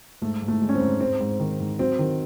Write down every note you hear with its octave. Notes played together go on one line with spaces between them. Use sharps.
G#2 A3
G#2
A3
G#3
C#4
C4
G#2
G#2 C4
G#2
D#3
G#2
F#3 C4
D#3